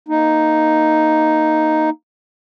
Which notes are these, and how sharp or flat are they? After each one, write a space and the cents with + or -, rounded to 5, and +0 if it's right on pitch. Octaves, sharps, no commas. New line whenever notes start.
A#3 +0 D#4 +0